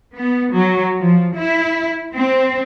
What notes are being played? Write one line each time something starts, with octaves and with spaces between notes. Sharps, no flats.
B3
F#3
F3
E4
C4